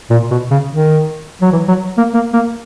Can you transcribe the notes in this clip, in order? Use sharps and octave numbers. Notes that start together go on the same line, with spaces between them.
A#2
B2
C#3
D#3
F#3
E3
F#3
A#3
A#3
A#3